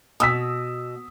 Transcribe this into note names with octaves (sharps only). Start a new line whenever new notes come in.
B2 D#6 E6 B6